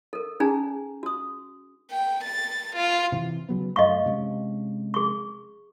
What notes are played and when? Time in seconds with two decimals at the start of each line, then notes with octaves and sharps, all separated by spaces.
0.13 A4 A#4
0.40 C#4 D#4 G#4 G5 G#5 A#5
1.03 F#4 D#6
1.91 G5
2.24 A6
2.76 F4
3.12 C3 E3
3.49 C#3 F#3 B3
3.76 F#2 A3 D#5 F5 C#6
4.06 C3 G#3 C#4
4.94 G#4 C#6